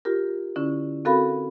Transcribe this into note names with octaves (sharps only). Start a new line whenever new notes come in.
F4 G4 A#4
D3 C#4 E4
C4 F#4 A4 A#4 F5 B5